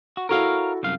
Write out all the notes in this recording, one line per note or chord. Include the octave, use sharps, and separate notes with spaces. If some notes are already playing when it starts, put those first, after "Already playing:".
F#4
E4 F#4 A4 A#4 C#5 F5
C2 F#2 F5